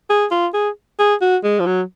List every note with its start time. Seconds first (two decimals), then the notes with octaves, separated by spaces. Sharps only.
0.10 G#4
0.31 F4
0.54 G#4
0.99 G#4
1.21 F#4
1.44 G#3
1.60 F3
1.66 F#3